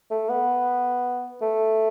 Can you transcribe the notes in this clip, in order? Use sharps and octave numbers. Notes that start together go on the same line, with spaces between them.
A3
B3
A3